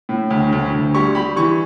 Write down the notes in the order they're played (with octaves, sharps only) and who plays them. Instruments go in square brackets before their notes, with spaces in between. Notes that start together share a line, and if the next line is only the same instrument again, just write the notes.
[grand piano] A2
D2
D2
D2
G3 C#6
G3 B5
E3 C#6